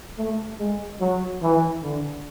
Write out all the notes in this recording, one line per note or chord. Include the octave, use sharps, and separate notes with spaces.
A3
G#3
F#3
E3
D3